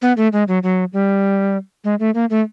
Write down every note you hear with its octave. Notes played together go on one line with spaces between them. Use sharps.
B3
A3
G#3
F#3
F#3
G3
G#3
A3
A#3
A3